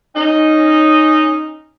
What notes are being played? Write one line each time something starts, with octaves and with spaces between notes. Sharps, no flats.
C#4 D#4